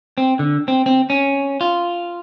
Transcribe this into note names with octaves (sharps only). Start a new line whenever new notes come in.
C4
D3
C4
C4
C#4
F4